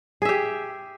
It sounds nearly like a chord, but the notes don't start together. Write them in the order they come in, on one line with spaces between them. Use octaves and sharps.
G#4 E5 G4